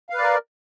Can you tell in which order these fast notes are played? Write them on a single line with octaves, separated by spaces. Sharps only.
F5 B4 D5 A#4